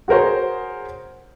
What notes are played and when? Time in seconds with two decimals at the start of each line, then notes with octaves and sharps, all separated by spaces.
0.08 F#4 G#4 A#4 C5 C#5